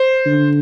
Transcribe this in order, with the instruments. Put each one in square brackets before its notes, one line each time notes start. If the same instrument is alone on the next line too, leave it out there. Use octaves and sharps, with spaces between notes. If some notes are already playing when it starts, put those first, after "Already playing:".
Already playing: [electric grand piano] C5
[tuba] D3